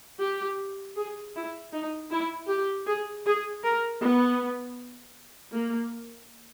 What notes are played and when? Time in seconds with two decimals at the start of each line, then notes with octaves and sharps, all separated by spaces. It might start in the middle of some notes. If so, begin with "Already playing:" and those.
0.21 G4
0.97 G#4
1.35 E4
1.73 D#4
2.11 E4
2.49 G4
2.87 G#4
3.26 G#4
3.64 A#4
4.01 B3
5.54 A#3